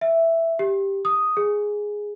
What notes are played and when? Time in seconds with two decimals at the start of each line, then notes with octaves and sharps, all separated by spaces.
0.01 E5
0.59 G4
1.05 D#6
1.37 G#4